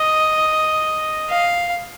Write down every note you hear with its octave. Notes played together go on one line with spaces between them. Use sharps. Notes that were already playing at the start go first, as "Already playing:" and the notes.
Already playing: D#5
F5